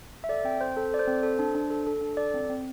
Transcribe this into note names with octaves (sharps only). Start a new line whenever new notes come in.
E5
A4 D5
C4 G5
C4 C5
A4
A4 D5
C5
C4
A4
D4
D4
A4
A4
D4
A4 D5
C4
C4